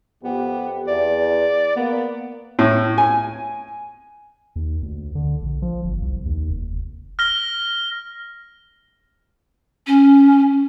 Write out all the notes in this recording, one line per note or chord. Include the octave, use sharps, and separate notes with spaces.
F2 B3 G4
E2 D5
A#3 B3
A2
G#5
D#2
D2
D3
A#1
F3
G1
C2
D#2
F1
F6 A#6 G7
C#4